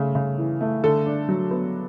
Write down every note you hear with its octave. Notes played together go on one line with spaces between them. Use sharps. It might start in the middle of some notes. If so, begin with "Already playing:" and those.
Already playing: C#3 A3
C#3
E3
A3
D3 A4
D4
F#3
B3